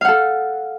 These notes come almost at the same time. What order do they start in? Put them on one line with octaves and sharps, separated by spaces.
F5 F#5 A4